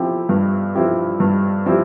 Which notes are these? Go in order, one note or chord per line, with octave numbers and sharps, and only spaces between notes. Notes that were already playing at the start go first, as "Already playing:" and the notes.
Already playing: F3 C4 E4 G4
G2
F3 C4 E4 G4
G2
F3 C4 E4 G4